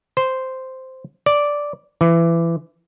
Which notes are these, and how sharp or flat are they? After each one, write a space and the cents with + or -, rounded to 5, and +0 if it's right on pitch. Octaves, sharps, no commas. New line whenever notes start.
C5 -5
D5 -5
E3 +20